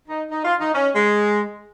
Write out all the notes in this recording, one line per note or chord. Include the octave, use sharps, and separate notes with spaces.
D#4
D#4
F4
D#4
C#4
G#3